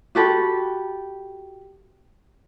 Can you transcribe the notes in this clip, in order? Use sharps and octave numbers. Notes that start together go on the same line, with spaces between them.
F#4 G4 A4 B5